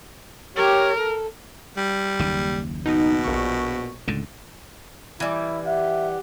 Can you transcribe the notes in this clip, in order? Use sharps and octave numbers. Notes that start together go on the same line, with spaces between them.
G4 A#4 C#5
A4
G3
F#1 D#2 C#3
B2 D#4
A#1 C#6
C#2 A2 D3
E3 G3 E4
G4 E5 F#5